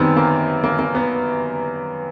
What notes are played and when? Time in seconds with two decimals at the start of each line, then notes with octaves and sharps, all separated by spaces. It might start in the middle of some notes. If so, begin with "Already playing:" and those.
Already playing: F#2 D#3 G3 B3 C4
0.16 A#3
0.64 A#3
0.79 A#3
0.95 B3